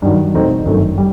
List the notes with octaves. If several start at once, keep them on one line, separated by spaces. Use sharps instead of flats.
G2 D#3 F#3
E2 B2 A3 C4 D#4
G1 F#2 D#3 A3
G3